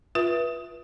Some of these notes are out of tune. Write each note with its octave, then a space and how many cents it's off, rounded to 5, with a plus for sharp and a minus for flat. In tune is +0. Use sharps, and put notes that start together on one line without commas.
F4 +0 B4 -25 E5 +0